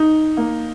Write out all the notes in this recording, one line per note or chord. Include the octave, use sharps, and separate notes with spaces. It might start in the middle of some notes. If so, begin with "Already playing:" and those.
Already playing: D#4
A#3